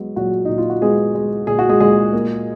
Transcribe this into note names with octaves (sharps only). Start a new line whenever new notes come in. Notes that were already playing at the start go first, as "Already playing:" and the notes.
Already playing: F#3 G#3 B3
A#2 F#3 F#4
A#2 D#4
F4
F#4
G#3 B3 G#4
G#3
A#2 G#4
F#4
G#3 G#4
A#2 G#3 G#4
A#3